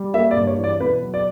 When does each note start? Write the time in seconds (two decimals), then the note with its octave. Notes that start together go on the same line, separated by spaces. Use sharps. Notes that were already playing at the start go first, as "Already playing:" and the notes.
Already playing: G3
0.14 A#3 E5
0.31 D5
0.36 G2
0.47 C#5
0.58 E3
0.64 D5
0.80 B2 B4
1.02 F#3
1.14 D5